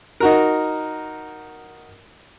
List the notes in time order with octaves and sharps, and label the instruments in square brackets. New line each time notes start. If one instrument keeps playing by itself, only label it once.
[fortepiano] D#4 F#4 A#4